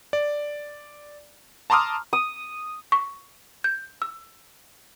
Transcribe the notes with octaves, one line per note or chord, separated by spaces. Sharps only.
D5
A5 A#5 C6 D6 D#6 F6
D#6
C#6
G6
E6